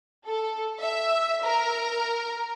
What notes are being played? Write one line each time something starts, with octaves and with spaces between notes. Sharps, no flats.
A4
E5
A#4